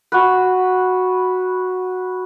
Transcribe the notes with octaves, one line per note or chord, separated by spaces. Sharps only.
F#4 B4